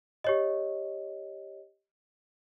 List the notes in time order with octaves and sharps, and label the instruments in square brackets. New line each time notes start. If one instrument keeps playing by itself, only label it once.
[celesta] G4 C#5 D#5